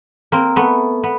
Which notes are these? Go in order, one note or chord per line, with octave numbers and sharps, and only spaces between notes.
A#3 C4
A3 B3
B3